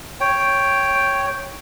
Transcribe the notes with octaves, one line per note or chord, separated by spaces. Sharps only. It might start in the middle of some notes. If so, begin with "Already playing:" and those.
C#5 G5